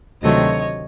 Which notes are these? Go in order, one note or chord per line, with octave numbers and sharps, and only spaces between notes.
D2 C3 D#3 F#3 A3 C#5 D#5